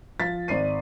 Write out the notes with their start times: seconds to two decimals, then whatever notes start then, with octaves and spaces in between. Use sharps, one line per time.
0.20 F3 F5 A6 B6
0.48 G#1 D5 C7 D#7